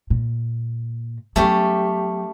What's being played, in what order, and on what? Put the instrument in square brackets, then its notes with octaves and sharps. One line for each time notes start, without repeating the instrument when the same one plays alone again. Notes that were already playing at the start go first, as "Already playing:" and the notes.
[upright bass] A#2
[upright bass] F#3 B3 [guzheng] A3 C#4 G4